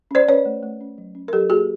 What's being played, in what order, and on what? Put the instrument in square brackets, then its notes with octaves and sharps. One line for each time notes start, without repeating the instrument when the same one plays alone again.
[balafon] C#4 C5 D5
C#4 B4 C#5
A3
A3
C#4
F#3
C#4
A#4
F#3 G4 A4
A#3 F#4 G#4